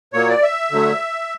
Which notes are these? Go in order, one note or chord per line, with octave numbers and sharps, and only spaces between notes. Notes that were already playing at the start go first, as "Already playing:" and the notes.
A#2 F#3 A#3 C#5
D5
E5
D3 F#3 A3